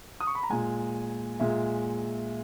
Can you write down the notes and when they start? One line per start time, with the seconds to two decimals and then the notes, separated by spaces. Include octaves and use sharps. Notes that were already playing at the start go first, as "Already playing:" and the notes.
0.20 D#6
0.27 C#6
0.35 B5
0.43 A#5
0.50 A#2 G#3 G#5
1.40 A#2 G#3 E5